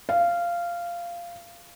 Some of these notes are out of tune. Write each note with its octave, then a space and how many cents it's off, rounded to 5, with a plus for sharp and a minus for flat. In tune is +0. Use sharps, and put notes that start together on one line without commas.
F5 -15